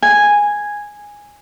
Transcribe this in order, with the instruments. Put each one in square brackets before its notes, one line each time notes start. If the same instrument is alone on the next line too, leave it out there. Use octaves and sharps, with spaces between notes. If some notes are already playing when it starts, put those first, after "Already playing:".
[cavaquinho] G#5